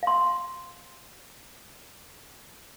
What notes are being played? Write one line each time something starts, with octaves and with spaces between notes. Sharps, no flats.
F5 C6